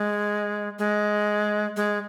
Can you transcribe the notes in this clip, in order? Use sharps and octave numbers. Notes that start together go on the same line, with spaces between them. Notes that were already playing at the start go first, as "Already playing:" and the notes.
Already playing: G#3
G#3
G#3